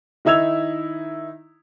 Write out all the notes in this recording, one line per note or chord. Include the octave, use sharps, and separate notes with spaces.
D#3 D#4 E4 E6 G#6 F7